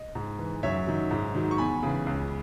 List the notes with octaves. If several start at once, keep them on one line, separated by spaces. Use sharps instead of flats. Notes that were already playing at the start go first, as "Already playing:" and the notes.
Already playing: D#5
G#2
E3
F#2 C#5 E5
D#3 F#3
G#2
D#3 F#3
C#6
E2 G#5 B5
C#3 E3
C#2